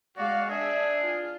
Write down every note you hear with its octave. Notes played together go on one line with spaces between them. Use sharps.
G#3 F#4 D5 F5
D4 G#4 E5
F4